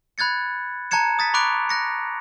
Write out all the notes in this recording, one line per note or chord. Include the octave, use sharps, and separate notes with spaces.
B5 F#6 G#6 A6 C#7
A5 A#5 F#6 G#6 C#7 E7
D#6 A6 B6 D#7
B5 C#6 D6 F#6 D7 F7
F#6 A#6 C#7